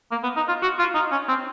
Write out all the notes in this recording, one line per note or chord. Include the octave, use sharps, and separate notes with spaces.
A#3
B3
D#4
F4
F#4
F4
D#4
C#4
C4